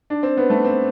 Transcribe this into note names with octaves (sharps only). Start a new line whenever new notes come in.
D4
C4
B3
A3
C4